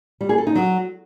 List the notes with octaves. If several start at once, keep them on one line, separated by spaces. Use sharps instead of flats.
G3
G#4
A4
D#4
F#3